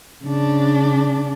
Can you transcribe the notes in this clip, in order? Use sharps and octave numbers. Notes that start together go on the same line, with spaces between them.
C#3 D4